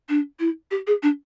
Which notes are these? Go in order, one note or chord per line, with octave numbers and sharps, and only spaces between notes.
D4
E4
G4
G#4
D4